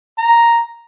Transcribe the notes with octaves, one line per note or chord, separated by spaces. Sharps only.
A#5